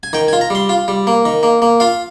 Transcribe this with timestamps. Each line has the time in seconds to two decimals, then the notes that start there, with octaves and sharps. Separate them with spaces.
0.03 G#5
0.13 D#3 G5
0.28 G#5
0.33 F4
0.41 A#5
0.50 G3 C6
0.69 F4
0.88 G3
1.07 A#3
1.25 D#3
1.43 A#3
1.62 A#3
1.80 F4 F5